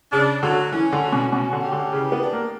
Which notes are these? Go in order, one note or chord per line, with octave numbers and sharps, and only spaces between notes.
C#3 D4
D3 F#3
E3 C#4
D3
F#4
B2
B2 C#4
D3
G4
D3
C#3 E3
B3
D4
A#3